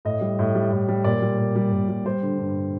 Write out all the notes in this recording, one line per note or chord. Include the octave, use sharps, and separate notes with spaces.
A2 D#5
G3
A2
G3
A2
G3
A#2 D5
G3
A#2
G3
A#2
G3
G3 C5
D3
G2